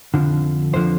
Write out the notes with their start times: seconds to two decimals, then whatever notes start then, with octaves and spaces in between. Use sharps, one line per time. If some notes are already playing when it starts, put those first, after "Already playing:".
0.14 F2 D3 F3
0.73 F2 D3 F3 C5